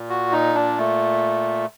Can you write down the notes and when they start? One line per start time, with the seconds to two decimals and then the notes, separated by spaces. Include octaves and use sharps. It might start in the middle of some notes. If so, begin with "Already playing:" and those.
Already playing: A#2
0.09 F#4
0.32 D#4
0.55 D4
0.78 A3